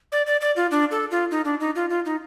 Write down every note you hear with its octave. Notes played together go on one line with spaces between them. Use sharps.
D5
D5
D5
F4
D4
A4
F4
D#4
D4
D#4
F4
F4
D#4